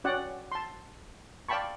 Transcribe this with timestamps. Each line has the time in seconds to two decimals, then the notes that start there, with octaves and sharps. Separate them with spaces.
0.04 C#4 F#4 D5 F#5 G5
0.52 A5 C6
1.49 D5 F5 G5 A5 B5 C#6